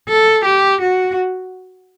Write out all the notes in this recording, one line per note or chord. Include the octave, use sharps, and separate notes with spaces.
A4
G4
F#4